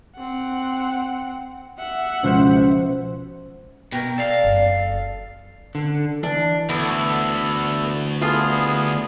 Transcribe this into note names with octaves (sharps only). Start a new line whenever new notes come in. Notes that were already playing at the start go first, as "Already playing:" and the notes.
C4 F#5
E5 F#5
C#2 B2 F3 C5
B2 A#4 G5
A4 D5 F5
F#1
D3
E3 D4
D2 B3 E4 A4
B3 E4 F4 G#4 A4 A5